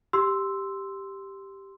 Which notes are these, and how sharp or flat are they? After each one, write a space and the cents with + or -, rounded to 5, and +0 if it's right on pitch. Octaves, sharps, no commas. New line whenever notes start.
G4 +0 C6 -5 E6 +0